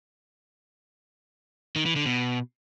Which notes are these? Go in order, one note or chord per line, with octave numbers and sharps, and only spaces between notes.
D#3
E3
D3
B2